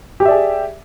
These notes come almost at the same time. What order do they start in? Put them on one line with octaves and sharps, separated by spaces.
G4 G5 E5 D5 G#4